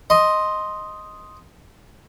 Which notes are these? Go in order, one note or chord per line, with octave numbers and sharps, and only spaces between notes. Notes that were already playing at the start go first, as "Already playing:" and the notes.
D#5 C6